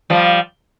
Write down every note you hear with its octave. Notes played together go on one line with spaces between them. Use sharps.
F3 G3